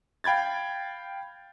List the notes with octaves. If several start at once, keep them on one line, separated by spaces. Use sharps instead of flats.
F5 G5 B5 G#6 A6